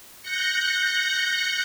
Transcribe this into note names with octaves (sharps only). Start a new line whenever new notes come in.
F#6 G6 A#6 C#7